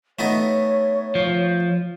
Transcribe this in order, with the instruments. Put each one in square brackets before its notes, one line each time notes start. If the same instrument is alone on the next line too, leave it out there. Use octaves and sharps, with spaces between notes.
[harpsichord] A3 B3 D#4 [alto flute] C#5
[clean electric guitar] F3